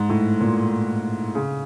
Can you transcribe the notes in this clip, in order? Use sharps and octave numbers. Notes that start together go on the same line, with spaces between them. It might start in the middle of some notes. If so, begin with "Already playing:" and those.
Already playing: G#2
A2
A#2
C#3